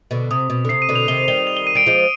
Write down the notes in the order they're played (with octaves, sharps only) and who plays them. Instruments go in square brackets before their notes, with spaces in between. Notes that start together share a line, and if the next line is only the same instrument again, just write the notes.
[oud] B2 D3
[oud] C3 [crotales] D#6
[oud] B2
D3
[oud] C3 [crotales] C7
[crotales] D#7
[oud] B2 D3
[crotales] F7
[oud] C3 D#3 [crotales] G7
[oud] D#3 G3 [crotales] G7
[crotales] F7
G7
D#7
[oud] G3 [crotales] D7
[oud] F3 G#3